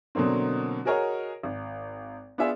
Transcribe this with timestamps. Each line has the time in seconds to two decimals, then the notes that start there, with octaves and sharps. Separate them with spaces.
0.15 B2 D3 F#3 A#3 C4
0.85 F#4 G#4 A#4 C#5 D#5
1.43 G#1
2.38 B3 D4 F4 G#4 E5